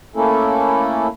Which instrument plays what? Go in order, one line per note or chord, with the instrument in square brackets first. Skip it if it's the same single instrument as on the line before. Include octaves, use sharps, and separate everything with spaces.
[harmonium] A3 A#3 C#4 E4 A4